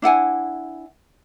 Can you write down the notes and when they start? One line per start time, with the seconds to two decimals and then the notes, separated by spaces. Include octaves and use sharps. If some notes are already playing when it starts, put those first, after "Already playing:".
0.02 D4 E4 F#5 G#5